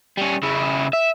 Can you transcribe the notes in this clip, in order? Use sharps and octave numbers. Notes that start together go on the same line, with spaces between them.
G3 C#4
C#3 E4
E5